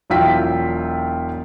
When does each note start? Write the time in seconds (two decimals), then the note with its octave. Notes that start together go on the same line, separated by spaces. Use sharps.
0.10 E1 F#3 E4 F4 G5 B6